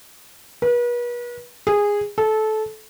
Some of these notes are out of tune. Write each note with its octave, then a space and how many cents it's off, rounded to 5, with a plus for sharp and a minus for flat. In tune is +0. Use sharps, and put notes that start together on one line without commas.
B4 -40
G#4 -15
A4 -20